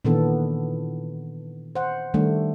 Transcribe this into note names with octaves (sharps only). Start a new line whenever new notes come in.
A#2 D#3 E3 B3 D4 A4
C5 F#5
D#3 G3 A3 D4